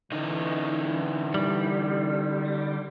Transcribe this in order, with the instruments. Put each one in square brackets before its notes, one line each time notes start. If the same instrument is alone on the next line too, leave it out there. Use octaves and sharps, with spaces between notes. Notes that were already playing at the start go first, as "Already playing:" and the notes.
[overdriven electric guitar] D3 D#4 [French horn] E3
[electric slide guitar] G3